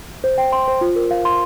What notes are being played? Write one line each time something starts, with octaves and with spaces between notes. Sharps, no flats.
C5
G5
C6
C5
F4
A#4
F5
C6